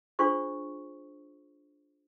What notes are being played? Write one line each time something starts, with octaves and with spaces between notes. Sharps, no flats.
D4 F4 G#4 C5 C#6